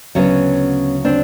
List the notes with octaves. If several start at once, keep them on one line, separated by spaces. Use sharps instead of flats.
D2 C#3 F#3 B3 C#4
C4 D4